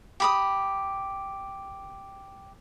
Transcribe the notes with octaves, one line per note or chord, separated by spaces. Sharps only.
G4 B5 D#6